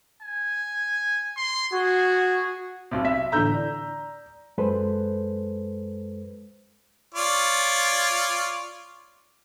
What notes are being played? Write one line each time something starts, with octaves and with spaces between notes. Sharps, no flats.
G#5
C6
F#4 G#4
B1 C3
E5 B6
A2 D3 E3 A#5 E6 G6
D5
F#2 G#3 A4 B4 C5
F4 C#5 D5